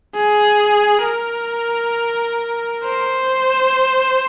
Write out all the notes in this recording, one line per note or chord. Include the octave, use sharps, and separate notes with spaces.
G#4
A#4
C5